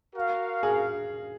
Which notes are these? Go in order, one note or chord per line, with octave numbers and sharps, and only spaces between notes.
F#4 A#4 F5
G#4